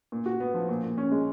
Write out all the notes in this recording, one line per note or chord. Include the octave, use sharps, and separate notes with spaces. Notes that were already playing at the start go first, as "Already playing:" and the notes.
A#2
F#4
B3
F3
A#2
A#2
C#4
G#3